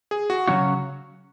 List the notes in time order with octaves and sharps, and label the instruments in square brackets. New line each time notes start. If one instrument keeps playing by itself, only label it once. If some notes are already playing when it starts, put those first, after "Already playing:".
[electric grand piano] G#4
F#4
[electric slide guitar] C#3 F#3 C#4 F#4